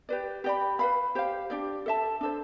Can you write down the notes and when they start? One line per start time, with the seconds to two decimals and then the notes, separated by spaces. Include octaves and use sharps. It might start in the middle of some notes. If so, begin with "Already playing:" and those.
0.09 G4 B4 D5
0.44 G4 D5 G5 B5
0.79 B4 F5 B5
1.15 G4 C5 F5
1.50 D4 G4 D5
1.86 A4 E5 A5
2.21 D4 A4 C5